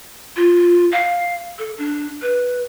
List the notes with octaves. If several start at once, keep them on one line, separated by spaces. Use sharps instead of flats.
F4
F5
A4
D4
B4